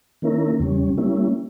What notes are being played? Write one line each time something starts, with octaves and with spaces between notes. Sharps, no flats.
D#3 A#3 C#4 E4 A#4
E2 C#3 G3 C#4
G3 A#3 C#4 E4